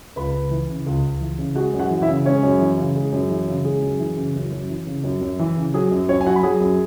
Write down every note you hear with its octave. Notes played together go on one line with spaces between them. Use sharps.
C#2 B4 B5
C#2
E3
C#3
C#2
C#2
E3
C#3
G#3 F#4 F#5
F#2
F#4 F#5
E3
E4 E5
C#3
G#3 C#4 C#5
F#2
E3
C#3
G#3
F#2
E3
C#3
G#3 G#4
F#2
E3
C#3
F#2
F#2
E3
C#3
F#2
F#2
E3
C#3
F#3 G#4
F#2
F#2 C#4 C#5
G#5
F#3 F#4 F#5
B5
F#3 G#4 G#5
F#2